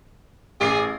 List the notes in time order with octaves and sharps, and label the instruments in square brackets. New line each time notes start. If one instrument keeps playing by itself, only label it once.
[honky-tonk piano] A1 D6 C7 [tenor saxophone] G#4